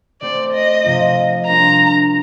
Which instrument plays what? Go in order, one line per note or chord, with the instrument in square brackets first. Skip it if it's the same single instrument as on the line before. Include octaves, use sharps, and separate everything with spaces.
[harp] A3 C4 G4 C5 [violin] D5
[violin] D#5
[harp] C3 F3 C4 F4
[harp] G3 D4 F4 A#4 [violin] A#5